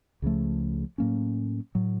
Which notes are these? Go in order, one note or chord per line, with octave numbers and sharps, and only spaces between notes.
C#2 C#3 F3 A3
A2 F#3 A#3 C#4
A2 F#3